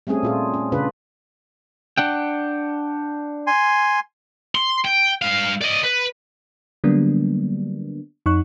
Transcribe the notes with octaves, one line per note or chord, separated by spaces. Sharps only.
G3 A3 C4 C#4 G#4
A#2 F4 G#4
C#4
C#3 D4 F4 B4
D4 F#5 G5
G#5 C6
C6
G5
G2 F5
D5 D#5
B4
D3 F#3 G3 A#3 B3 D4
F2 D#4 C#6 F#6